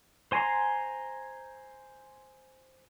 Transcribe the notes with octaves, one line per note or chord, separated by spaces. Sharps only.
C5 G#5 A#5 C6